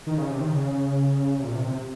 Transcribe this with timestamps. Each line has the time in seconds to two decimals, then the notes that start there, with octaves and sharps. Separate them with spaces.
0.07 D#3
0.18 C#3
0.30 C3
0.41 D#3
0.52 C#3
1.39 C3
1.44 A#2
1.55 C3
1.67 C3